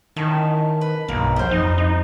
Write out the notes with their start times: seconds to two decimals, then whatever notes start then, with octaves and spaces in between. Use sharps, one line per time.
0.16 D#3 C#4 E4 A5
0.81 B4
1.08 B1 G2 G3 A#3
1.36 E3 F3 G3 C5
1.51 F2 D#4
1.78 D#4